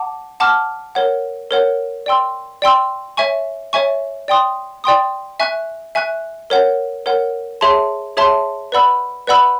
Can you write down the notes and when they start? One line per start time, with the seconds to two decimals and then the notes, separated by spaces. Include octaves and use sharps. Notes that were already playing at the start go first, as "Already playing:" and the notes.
Already playing: F#5 A5 D6
0.40 F#5 A5 D6 F6
0.95 A#4 C#5 F#5
1.51 A#4 C#5 F#5
2.06 D5 G5 C6 E6
2.62 D5 G5 C6 E6
3.17 C#5 E5 G#5 C#6
3.73 C#5 E5 G#5 C#6
4.28 D5 G5 C6 D#6
4.84 D5 G5 C6 D#6
5.40 E5 G#5 C#6 F#6
5.95 E5 G#5 C#6 F#6
6.50 A#4 C#5 F#5
7.06 A#4 C#5 F#5
7.61 G#4 C#5 E5 A5 C6
8.17 G#4 C#5 E5 A5 C6
8.72 B4 D5 F#5 B5 E6
9.27 B4 D5 F#5 B5 E6